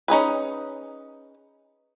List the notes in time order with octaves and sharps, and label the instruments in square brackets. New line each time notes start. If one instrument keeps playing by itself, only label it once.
[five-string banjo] C#4 D#4 G#4 B4